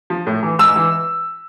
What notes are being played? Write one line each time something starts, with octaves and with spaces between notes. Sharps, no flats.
F3
A2
E3
G#2 E6
E3